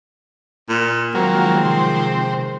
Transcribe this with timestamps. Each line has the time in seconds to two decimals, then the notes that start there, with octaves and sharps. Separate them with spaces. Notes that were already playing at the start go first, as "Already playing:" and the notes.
0.69 A#2
1.15 D#3 F3 F#3 G#3 A#3 C4
1.65 C3 C5